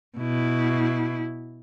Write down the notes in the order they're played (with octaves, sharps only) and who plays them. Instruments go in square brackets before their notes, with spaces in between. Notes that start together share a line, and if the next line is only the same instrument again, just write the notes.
[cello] B2 E4